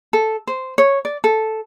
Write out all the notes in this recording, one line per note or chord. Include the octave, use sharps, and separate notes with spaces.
A4
C5
C#5
D5
A4